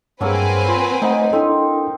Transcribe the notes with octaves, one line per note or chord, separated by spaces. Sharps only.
G2 F#3 A#3 C4 G#4 A4 B4 G#5
F4 B5 C6
A3 D#4 C5 F#5
C4 D4 E4 A4